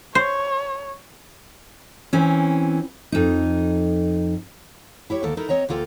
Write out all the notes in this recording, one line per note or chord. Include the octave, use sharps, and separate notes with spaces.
C5 C#5
E3 C4 C#4
F2 D#4
E4 G4 C#5
D2 D#3 A#3 A4
D#4 E4 A4 A#4
C4 C#5 D#5 A#5
D2 A#3 F4 A4 G5